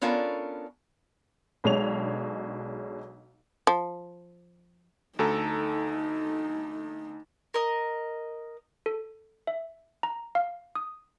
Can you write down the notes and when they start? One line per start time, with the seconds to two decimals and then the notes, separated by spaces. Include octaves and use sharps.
0.01 B3 C#4 D4 F4 A4 A#4
1.64 B1 B2 G#3 D4 C#5 F7
3.67 F3
5.19 D2 D#4 A4 A#5
7.54 A#4 D#5
8.86 A4
9.47 E5
10.03 A#5
10.35 F5
10.75 D#6